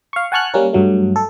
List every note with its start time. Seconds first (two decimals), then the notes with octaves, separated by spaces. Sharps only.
0.13 F5 C#6
0.32 F#5 G#5 A5 C#6 F6 F#6
0.54 G3 A#3 C#4 A#4
0.73 G2 F#3 A3
1.16 A4